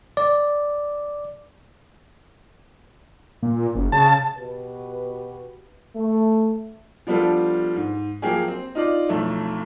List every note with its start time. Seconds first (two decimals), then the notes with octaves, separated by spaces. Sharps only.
0.17 D5
3.42 A#2
3.75 F#1
3.92 C#3 A5
4.39 B2 F#4 G4 B4
5.96 A3
7.07 F3 G3 B3 D4 F4 A4
7.76 G#2
8.22 F3 F#3 A#3 G4 G#4
8.48 C4
8.75 D#4 F4 D5
9.09 B1 F2 E3 A3